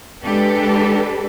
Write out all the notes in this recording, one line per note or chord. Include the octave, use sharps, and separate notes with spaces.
G#3 D4 G4 A4 B4